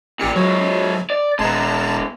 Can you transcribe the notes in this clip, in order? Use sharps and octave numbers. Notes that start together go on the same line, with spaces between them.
A1 A#2 G4 C#7
G#2 F#3 C#5
D5
D#1 G#3 B3 A5 A#5